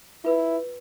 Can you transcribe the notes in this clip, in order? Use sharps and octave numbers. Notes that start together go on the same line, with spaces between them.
E4 F4 B4 E6